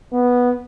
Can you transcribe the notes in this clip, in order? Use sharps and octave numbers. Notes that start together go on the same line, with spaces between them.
B3